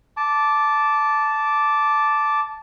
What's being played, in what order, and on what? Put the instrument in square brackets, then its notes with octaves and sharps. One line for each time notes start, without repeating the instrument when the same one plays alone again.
[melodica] A5 D6